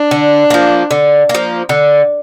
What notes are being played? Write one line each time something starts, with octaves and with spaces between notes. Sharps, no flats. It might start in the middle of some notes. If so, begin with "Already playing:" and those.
Already playing: D4
D3
F3 A#3
D3
A#3
F3
D3